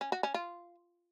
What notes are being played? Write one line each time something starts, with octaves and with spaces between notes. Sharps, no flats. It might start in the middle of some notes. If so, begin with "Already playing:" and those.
C#4
F#4
C#4
F4